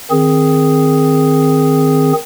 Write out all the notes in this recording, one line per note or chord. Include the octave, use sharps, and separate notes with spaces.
D#3 C4 G#4